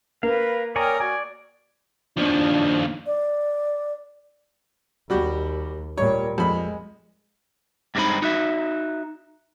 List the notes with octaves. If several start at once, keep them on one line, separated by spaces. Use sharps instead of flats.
A#3 A#4 B4 F5
A#4 C#5 D5 G5 G#5 D#6 F6
F#4 D5 G#5
D#2 F3 D4
D5
D#2 G3 F#4 G4
A#2 G3 C#5
F2 G#3 B5
G2 G3 G#3 C4 D#4 B5
D#4 F#4 E5